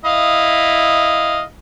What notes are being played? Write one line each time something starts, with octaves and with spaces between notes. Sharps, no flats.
E4 D#5 F5